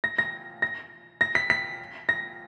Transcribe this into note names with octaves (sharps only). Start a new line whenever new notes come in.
A#6
A#6
A#6
A#6
B6
B6
A#6